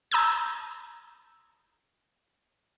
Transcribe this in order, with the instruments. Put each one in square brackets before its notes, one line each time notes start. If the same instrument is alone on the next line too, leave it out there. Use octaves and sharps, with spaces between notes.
[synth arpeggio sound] A5 A#5 D#6 E6 G6 G#6